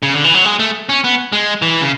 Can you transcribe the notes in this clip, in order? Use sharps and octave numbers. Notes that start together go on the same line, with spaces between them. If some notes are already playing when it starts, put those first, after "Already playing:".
C#3
D3
E3
F#3
G#3
A3
C#4
B3
G#3
E3
C#3